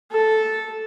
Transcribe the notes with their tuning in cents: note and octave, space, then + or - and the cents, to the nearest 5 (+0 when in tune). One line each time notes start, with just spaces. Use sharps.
A4 -5